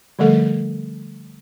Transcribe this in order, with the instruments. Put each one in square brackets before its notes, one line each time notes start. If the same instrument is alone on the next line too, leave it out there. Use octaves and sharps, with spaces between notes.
[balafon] D3 F3 G3 A3 A4